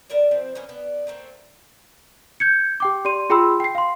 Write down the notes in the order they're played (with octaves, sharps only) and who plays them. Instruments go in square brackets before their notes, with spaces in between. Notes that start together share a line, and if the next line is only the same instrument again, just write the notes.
[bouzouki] B3 A#4 D5 E5
F3 C4 E4
A#3 B3 C#4 D#5
B3 D4
A3 A#3 C4
[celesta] G6 G#6 C#7
G4 G5 D6
G4 D5 C6 D#7
F4 G#4 G5 B5 C6 E6
G5 C7
F5 C6